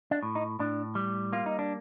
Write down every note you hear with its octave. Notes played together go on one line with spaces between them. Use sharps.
D4
A2
D#4
A2 D4
G3
A#3 F4
D#4
D4